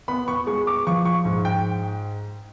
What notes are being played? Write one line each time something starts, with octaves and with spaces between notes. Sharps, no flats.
B3 B5
C#6
G#3 C#6
D6
F3 C#6
C#6
G#2
G5